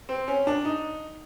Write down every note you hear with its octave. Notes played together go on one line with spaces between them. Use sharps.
C4
C#4
D4
D#4